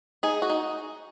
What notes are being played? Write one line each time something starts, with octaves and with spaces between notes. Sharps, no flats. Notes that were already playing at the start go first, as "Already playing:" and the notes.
D#4 G#4
F#4
D#4